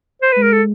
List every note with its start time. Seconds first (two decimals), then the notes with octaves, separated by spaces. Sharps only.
0.22 C5
0.32 B4
0.37 G#3
0.43 A#4
0.52 A4